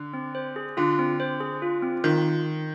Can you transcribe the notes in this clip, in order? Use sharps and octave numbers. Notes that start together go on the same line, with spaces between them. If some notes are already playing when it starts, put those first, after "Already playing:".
Already playing: D3
C4
C5
G#4
D3 F4
C4
C5
G#4
F4
C4
D#3 F4